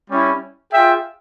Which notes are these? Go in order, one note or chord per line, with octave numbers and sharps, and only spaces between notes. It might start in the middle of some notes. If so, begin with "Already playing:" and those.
G3 C#4 E4
F4 G#4 E5 G5